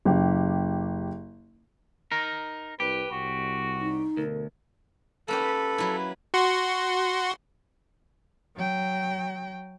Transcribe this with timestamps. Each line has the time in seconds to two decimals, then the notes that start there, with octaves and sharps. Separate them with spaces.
0.05 F#1 G4
2.12 D#4 A#4
2.80 C2 G4 B4
3.11 C2 F#4
3.81 D#4
4.17 D2 B2 A4 A#4
5.28 A#3 C#4 G4 A4 B4
5.78 F#3 E4
6.34 F#4 F#5 C6
8.57 F#3 G5